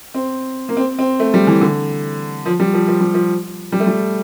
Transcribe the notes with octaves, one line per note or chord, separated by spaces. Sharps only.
C4
A#3
C4
C4
A3
G3
E3
D3
F3
G3
F3
F3
G3
F3
G3
A3
G3